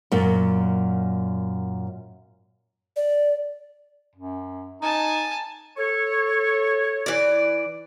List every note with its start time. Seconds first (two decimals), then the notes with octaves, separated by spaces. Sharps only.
0.12 F#2 A#2
2.96 D5
4.16 F#2
4.82 D#4 G#5 A5
5.78 A4 C#5
7.06 E3 D5